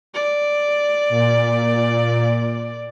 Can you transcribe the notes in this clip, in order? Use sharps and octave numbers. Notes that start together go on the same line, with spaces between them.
D5
A#2